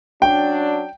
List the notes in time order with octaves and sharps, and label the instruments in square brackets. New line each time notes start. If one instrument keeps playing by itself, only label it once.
[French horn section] F#3 C#4 D4 [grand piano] G5